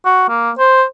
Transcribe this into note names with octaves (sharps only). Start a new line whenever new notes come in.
F#4
A#3
C5